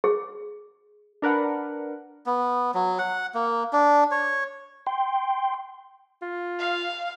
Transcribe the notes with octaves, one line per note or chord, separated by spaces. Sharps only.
G#4
D4 A#4 B4 F#5
B3
F#3
F#5
A#3
D4
C#5
G5 C6
F4
F5